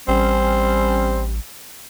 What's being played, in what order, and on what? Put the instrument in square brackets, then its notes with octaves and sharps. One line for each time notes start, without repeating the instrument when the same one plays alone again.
[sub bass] A1 [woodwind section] G3 C#4 [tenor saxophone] C4